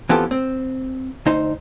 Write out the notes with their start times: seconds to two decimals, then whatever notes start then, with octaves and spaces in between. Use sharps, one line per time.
0.09 E3 B3 C4 F4 G4 A4
0.31 C4
1.26 D2 D#4 C5